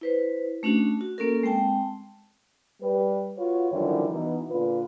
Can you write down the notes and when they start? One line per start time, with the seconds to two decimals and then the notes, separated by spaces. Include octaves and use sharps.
0.01 E4 B4 C5
0.63 A3 C#4 D4 F#4
1.01 F#4
1.18 A#3 C#4 A4 A#4
1.43 G#3 C4 G5 A5
2.81 G3 B4
3.37 F4 F#4 B4 C#5
3.72 F#2 D3 D#3 F3 G3 E4
4.11 B2 E3 D#4
4.50 A#2 D3 F4 B4